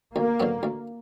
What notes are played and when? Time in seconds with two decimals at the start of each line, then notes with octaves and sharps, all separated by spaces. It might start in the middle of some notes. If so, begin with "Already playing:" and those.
0.15 D2 A#3
0.40 D3 F#3 B3
0.63 D2